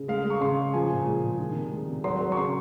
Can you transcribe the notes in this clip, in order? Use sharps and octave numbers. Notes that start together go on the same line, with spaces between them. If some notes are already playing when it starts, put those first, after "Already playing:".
Already playing: C#3
G#3 F5
G#3
C#6
C#3 C6
C#3
F3 G#5
A#2
G#3
A#2
D#3
C3
G#3
C3
F#3 C6
F#3
C#6
C#3 C6